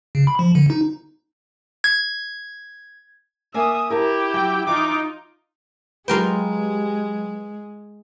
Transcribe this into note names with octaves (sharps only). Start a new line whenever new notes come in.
C#3
B5
F3
D3
D#4
G#6
A#3 D5 E5 G#5 D#6
E4 G4 A#4 A5
F#3 G5
E3 D#4 F4 D6
F#3 G#3 F4 G4 A#4 B4 G5